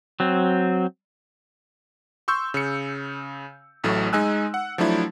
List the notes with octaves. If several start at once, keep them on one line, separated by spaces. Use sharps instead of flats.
F#3 C4
C6 C#6 E6 G6
C#3 C#7
A1 A2 F#3 A3
G#3 D#4 D#5 G#5 E6 F#6
F#5
F3 F#3 A3 D4 E4